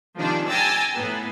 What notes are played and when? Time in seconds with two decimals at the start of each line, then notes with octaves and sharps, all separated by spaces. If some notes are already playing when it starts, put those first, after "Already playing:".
0.18 C3 D#3 F3 G#3 D4
0.47 G5 G#5 A#5 E6 A6
0.94 A2 B3